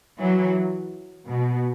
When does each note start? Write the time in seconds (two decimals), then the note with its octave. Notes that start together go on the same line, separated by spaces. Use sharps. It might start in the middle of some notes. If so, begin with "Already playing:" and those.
0.19 E3 F#3
1.28 B2